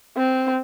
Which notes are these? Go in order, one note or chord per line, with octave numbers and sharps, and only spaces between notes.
C4